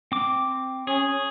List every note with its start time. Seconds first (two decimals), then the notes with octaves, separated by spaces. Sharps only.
0.12 C4 D6
0.87 C#4 G#4